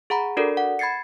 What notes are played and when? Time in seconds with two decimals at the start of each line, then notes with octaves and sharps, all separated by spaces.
0.10 G#4 F#5 A#5 B5
0.37 D4 F#4 A4 A#4 D5
0.57 F#5
0.79 B5 G#6 A6 C7 C#7